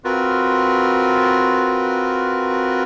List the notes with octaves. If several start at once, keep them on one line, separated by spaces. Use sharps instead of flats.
C4 F4 F#4 A#4 B4